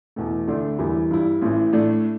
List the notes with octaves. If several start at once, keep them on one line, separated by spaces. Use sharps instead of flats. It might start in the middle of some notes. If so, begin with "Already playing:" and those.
E2 B2 A3
D2 D3 A3 D4
E1 E2 E3 G3 E4
G2 G3 E4
A1 A2 E3
A2 A3 D4